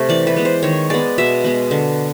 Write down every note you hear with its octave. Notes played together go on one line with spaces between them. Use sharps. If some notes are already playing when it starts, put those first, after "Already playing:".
Already playing: C3 A3
E3 D5
B4
G#3 B3
C5
D#3 C#5
G#3 B3 D5
B2 E5
G#3 B3
D3